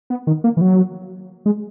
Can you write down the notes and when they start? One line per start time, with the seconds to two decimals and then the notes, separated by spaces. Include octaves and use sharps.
0.10 B3
0.27 D#3
0.44 A#3
0.57 E3
0.61 F#3
1.46 G#3